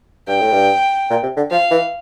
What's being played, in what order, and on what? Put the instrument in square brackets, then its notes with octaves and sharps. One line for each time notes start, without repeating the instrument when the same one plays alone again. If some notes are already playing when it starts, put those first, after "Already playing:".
[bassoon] G2 [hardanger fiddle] G5
[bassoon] A2
G2
A#2
C3
D3
[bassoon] F3 [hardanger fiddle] F5
[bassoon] E3